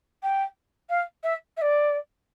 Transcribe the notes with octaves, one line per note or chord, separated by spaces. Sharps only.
G5
F5
E5
E5
D5